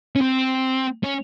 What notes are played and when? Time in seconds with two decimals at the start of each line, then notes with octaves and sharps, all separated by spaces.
0.16 C#4
0.21 C4
1.04 C#4